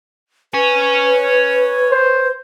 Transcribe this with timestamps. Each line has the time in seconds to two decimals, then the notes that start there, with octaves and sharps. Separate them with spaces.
0.54 B4 C#5 G#5
1.91 C5